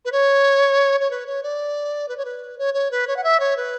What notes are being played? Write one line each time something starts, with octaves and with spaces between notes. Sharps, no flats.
B4
C#5
C#5
B4
C#5
D5
B4
C#5
B4
C#5
C#5
B4
C#5
F#5
E5
C#5
B4